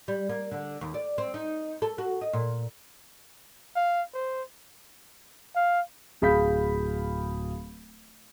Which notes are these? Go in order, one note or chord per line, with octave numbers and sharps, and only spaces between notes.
G3
A#3
D3
D#2
D5
C4
D#4
A4
F#4
D#5
A#2
F5
C5
F5
D1 G#4 F5 B5 G6 B6